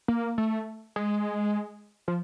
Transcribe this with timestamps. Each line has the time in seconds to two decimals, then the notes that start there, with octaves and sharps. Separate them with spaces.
0.08 A#3
0.38 A3
0.96 G#3
2.08 F3